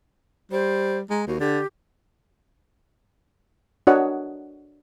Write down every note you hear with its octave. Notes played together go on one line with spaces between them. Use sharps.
G3 C5
G#3 A#5
D#2 F#4
D3 G4
D4 F#4 A#4 C#5 D#5 F#5